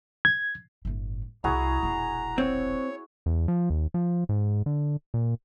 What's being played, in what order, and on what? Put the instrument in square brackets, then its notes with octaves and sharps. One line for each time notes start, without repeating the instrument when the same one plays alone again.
[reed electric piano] G#6
[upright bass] G1 A2
[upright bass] C2 C3 [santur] E4 F#4 G#4 [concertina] A#5
[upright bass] E1 A#1
[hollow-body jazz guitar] C4 [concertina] C#5
[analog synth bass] E2
F3
D#2
F3
G#2
D3
A#2